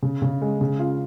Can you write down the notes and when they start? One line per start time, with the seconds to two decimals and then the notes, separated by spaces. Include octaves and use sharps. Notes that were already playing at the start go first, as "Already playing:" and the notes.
0.03 C#3
0.22 C#3
0.42 G#3
0.61 C#3
0.79 F4